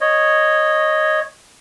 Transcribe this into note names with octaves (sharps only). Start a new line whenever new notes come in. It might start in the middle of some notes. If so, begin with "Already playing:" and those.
C#5 D#5